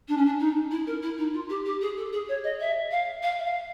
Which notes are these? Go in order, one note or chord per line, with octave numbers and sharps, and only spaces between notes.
D4
C#4
D4
D#4
E4
A#4
E4
D#4
F4
G4
G4
G#4
A4
G#4
C#5
D#5
E5
F5
F5
E5
F5